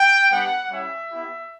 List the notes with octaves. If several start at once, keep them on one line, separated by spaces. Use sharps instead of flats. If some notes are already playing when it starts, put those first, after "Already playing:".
Already playing: G5
G3 B3 D4 G4 F#5
G3 C#4 E4 G4 E5
B3 E4 G4